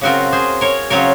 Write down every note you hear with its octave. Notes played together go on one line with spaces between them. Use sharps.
C#3 F#3 C4 F4 F#4 A#4
G#4 C5
A#4 C#5
C#3 F#3 C4 F4 A#4 C#5